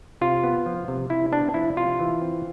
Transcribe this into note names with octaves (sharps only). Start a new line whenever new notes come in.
C3 F4
B3
F3
C3
C3 E4
B3 D4
F3 E4
C3 F4
E3
C4